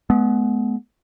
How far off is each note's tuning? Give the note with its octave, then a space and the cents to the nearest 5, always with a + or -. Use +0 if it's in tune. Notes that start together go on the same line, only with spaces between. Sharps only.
G#3 +40 B3 +0